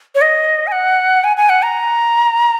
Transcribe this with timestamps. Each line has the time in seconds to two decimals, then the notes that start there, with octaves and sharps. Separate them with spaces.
0.15 C#5
0.21 D#5
0.67 G#5
0.72 F#5
1.24 G#5
1.37 G#5
1.49 F#5
1.62 A#5